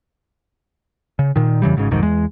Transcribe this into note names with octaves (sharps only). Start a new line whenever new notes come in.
C#3
A#2 D#3
F2 C#3 E3 G3
G#1 G#2 C#3
B1 F2 G#2 D#3
E2 G#3